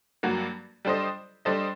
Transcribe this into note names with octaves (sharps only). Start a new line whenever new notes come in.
G2 F#3 A#3 F#4
G3 D4 A4 C5 D#5
G3 D4 A4 C5 D#5